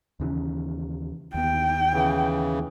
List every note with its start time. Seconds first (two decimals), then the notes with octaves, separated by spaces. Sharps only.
0.20 D#2 C#3 E3
1.34 D#2 B3 G5
1.94 C#3 E3